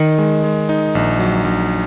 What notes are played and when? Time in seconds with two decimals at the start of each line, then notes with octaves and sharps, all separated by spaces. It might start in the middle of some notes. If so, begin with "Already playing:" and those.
Already playing: D#3 D#4
0.18 G#3
0.44 G#3
0.69 D#4
0.95 A#1
1.20 F#3
1.45 A#1